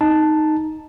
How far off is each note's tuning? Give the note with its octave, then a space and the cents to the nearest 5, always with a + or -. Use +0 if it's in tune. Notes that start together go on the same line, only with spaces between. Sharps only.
D#4 +0 A5 +0